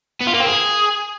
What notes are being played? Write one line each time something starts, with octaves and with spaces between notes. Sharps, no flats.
B3
F4
A#3
C4
G#4